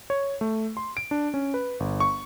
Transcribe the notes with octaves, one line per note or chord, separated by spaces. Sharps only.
C#5
A3
C6
D7
D4
C#4
B4
G1
C#6